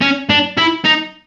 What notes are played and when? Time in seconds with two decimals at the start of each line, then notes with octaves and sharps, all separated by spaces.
0.01 C#4
0.30 D4
0.58 E4
0.85 D#4